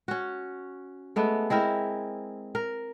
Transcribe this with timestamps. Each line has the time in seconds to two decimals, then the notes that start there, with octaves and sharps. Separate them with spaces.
0.08 C#4 F#4
1.16 G#3 A3 B3
1.50 G#3 C4 E4 A#4
2.55 A#4